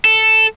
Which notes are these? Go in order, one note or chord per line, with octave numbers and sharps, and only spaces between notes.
A4